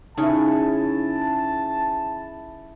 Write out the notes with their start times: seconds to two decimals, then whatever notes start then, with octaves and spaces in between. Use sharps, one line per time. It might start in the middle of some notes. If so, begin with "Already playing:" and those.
0.18 C#3 D#4 E4 G#5 A5 C#6